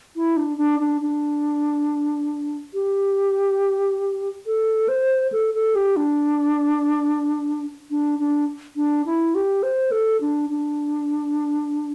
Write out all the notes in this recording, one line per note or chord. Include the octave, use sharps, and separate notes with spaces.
E4
D4
D4
D4
D4
G4
A4
C5
A4
A4
G4
D4
D4
D4
D4
E4
G4
C5
A4
D4
D4